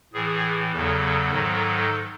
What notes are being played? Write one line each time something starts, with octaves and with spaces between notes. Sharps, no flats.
A2 E3 G#4
E2 C#3 F#3 A4
G#2 D#3 F#3